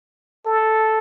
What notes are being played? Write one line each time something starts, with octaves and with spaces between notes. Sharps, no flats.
A4